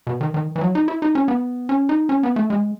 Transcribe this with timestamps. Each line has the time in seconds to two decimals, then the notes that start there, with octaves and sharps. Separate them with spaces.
0.07 B2
0.21 D#3
0.34 D#3
0.56 E3
0.61 F#3
0.75 D#4
0.88 E4
1.02 D#4
1.15 C#4
1.28 B3
1.69 C#4
1.89 D#4
2.09 C#4
2.23 B3
2.36 A3
2.50 G#3